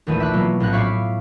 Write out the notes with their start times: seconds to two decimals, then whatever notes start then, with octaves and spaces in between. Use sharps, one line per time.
0.07 A#1 D#2 E3 A3 D#7
0.20 E5 D6 F#6
0.33 B2 F#3 A#3 B3 F4
0.60 A#1 A2 A#3 C#4 F#6
0.73 C#5 E5 F5 B5 D6